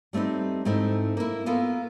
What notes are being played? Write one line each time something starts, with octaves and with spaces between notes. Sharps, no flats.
G3 A3 C4 D#4 B4
G#2 A3 C4 D#4 E4
A#3 E4
A#3 B3 F4 A4 A#4